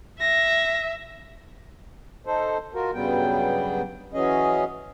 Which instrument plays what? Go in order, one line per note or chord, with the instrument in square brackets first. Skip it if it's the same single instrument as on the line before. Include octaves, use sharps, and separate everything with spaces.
[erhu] E5 [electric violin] A#6
[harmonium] D#4 A4 C5
F4 F#4 A#4
G2 C#3 F#3 G3 B3 G5
E3 F#3 C#4 G#4 D#5